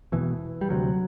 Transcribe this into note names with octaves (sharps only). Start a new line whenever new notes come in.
E1 E2 B2 E3
G3
D2 C3 F#3